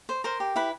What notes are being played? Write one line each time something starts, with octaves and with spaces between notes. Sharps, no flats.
C5
A#4 C5 C6
G4
E4 B4 B5